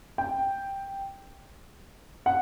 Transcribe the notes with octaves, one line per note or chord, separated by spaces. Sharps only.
G5
F#5